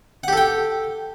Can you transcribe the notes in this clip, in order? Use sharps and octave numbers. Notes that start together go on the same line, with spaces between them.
G4 A4 F#5 G5